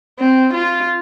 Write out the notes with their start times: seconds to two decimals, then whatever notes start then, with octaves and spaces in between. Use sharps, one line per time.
0.19 C4
0.53 F4